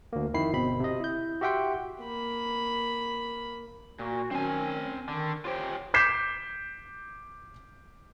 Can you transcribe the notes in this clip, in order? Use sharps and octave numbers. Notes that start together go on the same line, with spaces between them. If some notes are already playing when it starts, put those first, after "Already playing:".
D2 A#3
F2 D#3 E4 B5 C7
G1 B2 C4 B5
C3 D#5
E4 G6
F#4 G4 E5 F#5 G5 C6
A#3 B5
A#2 F#4
D#3 F#3 C4 C#4 G#5
D3 D#3
F4 G4 C5 C#5 G5
D6 G6 B6 C7 E7